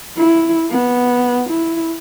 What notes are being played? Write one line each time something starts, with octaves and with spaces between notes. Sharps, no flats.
E4
B3
E4